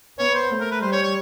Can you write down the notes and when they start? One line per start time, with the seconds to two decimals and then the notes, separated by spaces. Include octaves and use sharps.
0.18 B3 C#5
0.34 C5
0.50 A3
0.60 A#4
0.71 B4
0.82 G3 C5
0.92 C#5
1.03 C#5